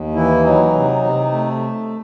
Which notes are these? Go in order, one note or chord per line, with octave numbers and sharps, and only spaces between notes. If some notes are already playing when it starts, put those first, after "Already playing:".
Already playing: D#2
E3 E4
F#3 D#4
C3
C3
A3